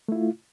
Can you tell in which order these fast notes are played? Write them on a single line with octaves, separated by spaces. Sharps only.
A3 E4 F4